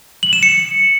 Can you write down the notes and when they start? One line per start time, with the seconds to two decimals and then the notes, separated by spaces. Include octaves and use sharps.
0.23 F#7
0.33 E7
0.43 C#7